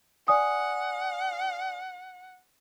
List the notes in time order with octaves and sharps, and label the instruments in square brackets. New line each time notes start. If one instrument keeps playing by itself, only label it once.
[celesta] D5 G#5 D#6 [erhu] F#5